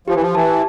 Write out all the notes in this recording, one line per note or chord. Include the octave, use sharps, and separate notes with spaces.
F3 G4
E3
F3
E3 A5